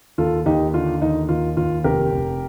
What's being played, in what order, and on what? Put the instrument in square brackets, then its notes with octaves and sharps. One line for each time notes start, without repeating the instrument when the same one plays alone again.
[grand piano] D#2 F4 A4
D#2 D#4 G4
D3 F4
D#2 D#4
D#2 F4
D#2 F4
F1 G4 A#4
F1